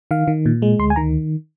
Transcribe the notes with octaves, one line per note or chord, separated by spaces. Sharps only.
D#3 F5
D#3
A#2
G#3
D2 C6
G#5
D#3 A#5